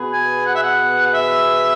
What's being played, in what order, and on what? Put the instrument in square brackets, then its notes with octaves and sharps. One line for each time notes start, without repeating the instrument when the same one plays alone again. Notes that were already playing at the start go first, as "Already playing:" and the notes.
Already playing: [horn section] B2 B3 G#4 B4
[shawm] G#5
F#5
E5
F#5
E5